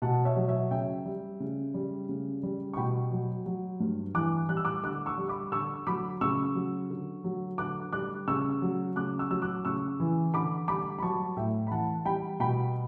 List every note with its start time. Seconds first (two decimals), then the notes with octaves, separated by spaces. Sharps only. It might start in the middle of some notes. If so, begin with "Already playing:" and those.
0.02 B2 F#5 A5
0.25 C#5 E5
0.36 F#3
0.48 C#5 E5
0.71 C#3 E5 G5
1.05 G3
1.40 C#3
1.74 G3
2.09 C#3
2.43 G3
2.74 C#6
2.77 B2 G5 B5
3.12 F#3
3.46 F#3
3.80 G2
4.15 E3 D6 F#6
4.49 G3 F#6
4.57 E6
4.65 D6 F#6
4.83 D3 D6 F#6
5.06 C#6 E6
5.18 G3
5.29 B5 D6
5.52 D3 C#6 E6
5.87 F#3 B5 D6
6.21 C#3 C#6 E6
6.55 F#3
6.90 D3
7.24 F#3
7.58 D3 D6 F#6
7.93 G3 D6 F#6
8.28 C#3 C#6 E6
8.62 F#3
8.96 C#3 D6 F#6
9.19 C#6 E6
9.30 F#3 E6
9.42 D6 F#6
9.65 C#3 C#6 E6
10.00 E3
10.34 D3 B5 D6
10.68 G3 B5 D6
10.99 B5
11.02 F#3 A5 C#6
11.37 A2 E5 G5
11.67 B5
11.71 E3 F#5 A5
12.06 G3 G5 B5
12.40 B2 G5 B5